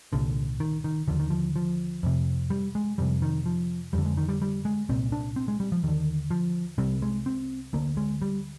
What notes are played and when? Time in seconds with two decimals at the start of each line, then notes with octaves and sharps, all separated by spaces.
0.13 C2 A#2 D3
0.60 D#3
0.84 D#3
1.08 D#2 D3 F3
1.20 D#3
1.30 F3
1.56 F3
2.03 F2 C3
2.50 G3
2.75 G#3
2.98 F2 C3 G3
3.22 D#3
3.46 F3
3.93 F2 D3 G3
4.05 G#3
4.17 D#3
4.29 G3
4.42 G3
4.65 G#3
4.89 C2 A#2 C4
5.12 D4
5.36 C4
5.48 G#3
5.60 G3
5.72 F3
5.83 D#2 D3 D#3
6.31 F3
6.78 C2 C3 G3
7.02 G#3
7.26 C4
7.73 D2 D3 A#3
7.97 G#3
8.22 G3